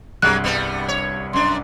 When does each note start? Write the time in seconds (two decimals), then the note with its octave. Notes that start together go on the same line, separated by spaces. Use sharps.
0.22 C2 G2 F#3 G#3 F#6
0.44 G3 B3
0.88 C#5
1.33 F#2 D4 C6